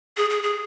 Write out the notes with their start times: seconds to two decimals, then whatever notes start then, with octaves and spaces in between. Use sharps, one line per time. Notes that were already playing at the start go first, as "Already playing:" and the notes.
0.17 G#4
0.30 G#4
0.43 G#4